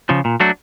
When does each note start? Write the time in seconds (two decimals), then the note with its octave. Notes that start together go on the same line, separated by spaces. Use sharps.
0.09 C#3 F3
0.25 A#2
0.40 F#3 A3 D4 F#4